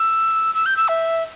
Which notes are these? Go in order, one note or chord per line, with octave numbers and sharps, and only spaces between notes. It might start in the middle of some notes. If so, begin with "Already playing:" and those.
Already playing: E6
E6
G6
E6
E5